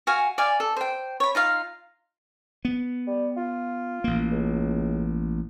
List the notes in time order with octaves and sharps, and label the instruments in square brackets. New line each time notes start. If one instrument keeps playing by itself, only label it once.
[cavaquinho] F#4 F5 G#5
D5 F5 G#5
A4
C5 G5
C#5 B5
D#4 F4 F5
[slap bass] B3
[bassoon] G3
F4
[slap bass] A1 A#3
[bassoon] C#2